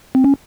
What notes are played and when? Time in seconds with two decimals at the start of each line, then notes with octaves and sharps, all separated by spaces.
0.15 C4
0.24 C#4